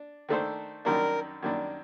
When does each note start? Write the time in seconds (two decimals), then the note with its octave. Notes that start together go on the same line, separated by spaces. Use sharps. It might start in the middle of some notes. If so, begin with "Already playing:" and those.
Already playing: D4
0.29 D#3 A3 D4 A4 C5
0.85 F#2 D#3 G3 D4 A#4
1.43 F#2 D#3 G3 D4